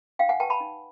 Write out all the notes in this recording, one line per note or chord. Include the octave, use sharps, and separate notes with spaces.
D#4 F5 G5
F#5 G#5
G4 B4 G5 A5
A5 B5
D#4